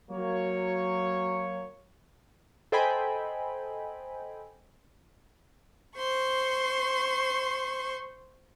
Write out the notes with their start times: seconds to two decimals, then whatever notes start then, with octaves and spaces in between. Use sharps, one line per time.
0.11 F#3 A#3 C#5
2.72 A4 C5 D#5 G5 G#5 B5
5.96 C5 C6 C#6